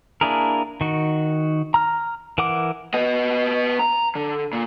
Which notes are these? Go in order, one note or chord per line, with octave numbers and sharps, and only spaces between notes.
A#3 D4 E4 G#4 A#4
D#3 F#4
A#5 F6
E3 A#4 F#5 D6
B3 D#5
A#5
D3
A#2